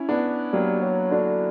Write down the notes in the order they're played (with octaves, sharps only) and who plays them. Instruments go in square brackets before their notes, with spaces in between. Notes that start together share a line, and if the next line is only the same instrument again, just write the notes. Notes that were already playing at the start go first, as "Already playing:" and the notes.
Already playing: [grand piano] C#4 E4
B3 D4
[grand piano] F#3 A#3 [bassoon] G3
[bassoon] F#3
[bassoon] D3 [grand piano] D4 F#4